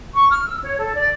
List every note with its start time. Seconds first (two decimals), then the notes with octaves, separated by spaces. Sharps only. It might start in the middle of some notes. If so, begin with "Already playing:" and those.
0.14 C#6
0.29 F6
0.45 E6
0.63 C#5
0.78 A4
0.95 D5